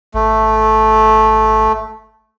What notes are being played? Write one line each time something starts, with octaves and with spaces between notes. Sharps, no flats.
G#1 A3